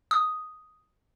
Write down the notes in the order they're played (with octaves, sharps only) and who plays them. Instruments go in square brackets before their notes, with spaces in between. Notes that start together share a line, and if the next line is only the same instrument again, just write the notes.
[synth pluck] D#6